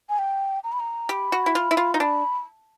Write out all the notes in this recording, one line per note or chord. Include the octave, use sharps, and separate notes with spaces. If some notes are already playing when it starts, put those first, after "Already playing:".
G#5
G5
A#5
B5
A#5
G4 B5
F#4
E4
F4
E4
F4
D#4
D4 B5